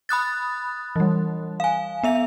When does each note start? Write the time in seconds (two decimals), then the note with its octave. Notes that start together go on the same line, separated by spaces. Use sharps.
0.09 B5 D#6 F#6 A6
0.96 E3 G3
1.60 F5 G#5
2.03 B3 E5 F7